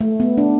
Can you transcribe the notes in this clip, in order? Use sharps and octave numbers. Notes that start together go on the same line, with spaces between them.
A3
B3
D4